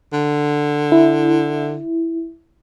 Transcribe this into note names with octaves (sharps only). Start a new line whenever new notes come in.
D3
E4